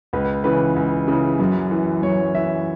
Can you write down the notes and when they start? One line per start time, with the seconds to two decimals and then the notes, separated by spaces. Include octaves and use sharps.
0.13 C#2 B4
0.44 C#3 E3 B4
0.76 C#2
1.08 C#3 E3
1.39 F#2
1.71 E3
2.02 F#2 C#5
2.34 E3 E5